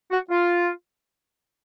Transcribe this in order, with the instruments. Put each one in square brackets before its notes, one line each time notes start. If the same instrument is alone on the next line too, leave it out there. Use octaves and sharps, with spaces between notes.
[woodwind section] F#4
F4